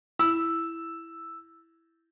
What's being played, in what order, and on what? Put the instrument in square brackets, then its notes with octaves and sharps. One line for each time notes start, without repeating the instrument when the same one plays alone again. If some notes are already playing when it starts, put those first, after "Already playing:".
[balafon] E4 [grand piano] E6